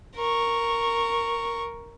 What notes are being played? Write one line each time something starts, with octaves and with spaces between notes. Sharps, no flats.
A#4 C#6